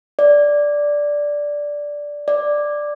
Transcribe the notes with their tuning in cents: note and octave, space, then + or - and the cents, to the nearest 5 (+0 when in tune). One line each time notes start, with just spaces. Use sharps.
D5 -5
D5 +5